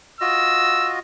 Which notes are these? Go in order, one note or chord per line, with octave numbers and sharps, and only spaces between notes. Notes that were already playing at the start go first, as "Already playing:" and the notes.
F4 F#4 D#5 E6